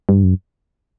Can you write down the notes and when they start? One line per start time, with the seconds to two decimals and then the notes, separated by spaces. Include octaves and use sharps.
0.09 G2
0.24 F#2